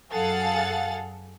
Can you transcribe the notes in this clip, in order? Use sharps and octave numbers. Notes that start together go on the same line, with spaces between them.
F#2 G#4 A4 F5 F#5 A6